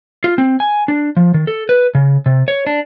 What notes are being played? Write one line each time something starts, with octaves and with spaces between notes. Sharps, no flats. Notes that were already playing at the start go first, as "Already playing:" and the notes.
F4
C4
G#5
D4
F3
D#3
A4
B4
C#3
C3
C#5
D4